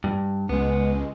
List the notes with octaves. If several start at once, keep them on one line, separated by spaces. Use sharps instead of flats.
G2
C#2 G#3 B3